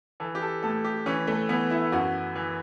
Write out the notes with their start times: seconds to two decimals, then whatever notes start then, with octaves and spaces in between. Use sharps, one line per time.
0.20 E3 A4
0.35 G4
0.41 A4
0.62 A2 A4
0.84 G4
1.06 E3 C#4
1.27 A3
1.49 E3 B3
1.70 E4
1.92 F#2 F#4
2.36 E3